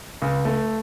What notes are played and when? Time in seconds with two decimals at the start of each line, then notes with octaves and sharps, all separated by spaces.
0.22 C#2
0.45 A3